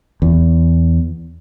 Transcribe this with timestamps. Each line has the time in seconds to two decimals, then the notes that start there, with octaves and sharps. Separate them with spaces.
0.22 E2